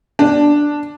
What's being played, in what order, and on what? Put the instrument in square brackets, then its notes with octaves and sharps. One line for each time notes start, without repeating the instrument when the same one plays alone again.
[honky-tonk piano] D4